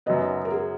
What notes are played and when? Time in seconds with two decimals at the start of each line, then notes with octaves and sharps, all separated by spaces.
0.06 F#2 C#3 F#3 B3 D#5
0.45 A#4
0.51 G#4